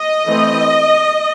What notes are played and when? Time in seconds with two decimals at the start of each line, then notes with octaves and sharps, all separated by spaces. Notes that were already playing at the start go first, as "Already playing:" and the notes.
Already playing: D#5
0.26 E3 A3 C4